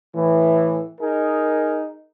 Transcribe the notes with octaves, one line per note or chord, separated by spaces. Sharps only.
A2 E3
D#4 G#4 A#4